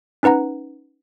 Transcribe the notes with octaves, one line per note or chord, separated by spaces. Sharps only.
C#4 D#4 B4 F#5 A#5